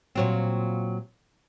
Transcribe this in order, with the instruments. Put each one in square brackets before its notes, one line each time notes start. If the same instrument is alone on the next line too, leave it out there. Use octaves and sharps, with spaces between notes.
[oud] A#2 F#3 C4